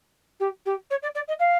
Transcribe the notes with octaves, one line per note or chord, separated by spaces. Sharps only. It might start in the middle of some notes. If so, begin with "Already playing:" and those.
G4
G4
C#5
D5
D5
D#5
F5